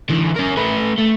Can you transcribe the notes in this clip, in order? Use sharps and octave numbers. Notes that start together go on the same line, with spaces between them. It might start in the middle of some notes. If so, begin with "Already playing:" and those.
D3 E3
C#4 A#4
A3 B4
A3